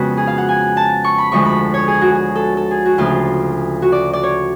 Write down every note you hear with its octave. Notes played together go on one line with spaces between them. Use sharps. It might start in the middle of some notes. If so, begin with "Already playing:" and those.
Already playing: F2 C#3 G#3 B3 F#4 B4
G#4
F5
F#5
G#5
A5
C#6
B5
D2 D3 F3 G#3 C#6
B5
C#5
G#4
F#4
G#4
A4
A4
G#4
F#4
D2 C#3 F3 F4
F#4
D5
D5
C#5